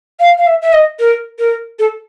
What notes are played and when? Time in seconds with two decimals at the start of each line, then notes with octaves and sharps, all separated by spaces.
0.20 F5
0.38 F5
0.47 E5
0.62 E5
0.73 D#5
0.99 A#4
1.39 A#4
1.79 A4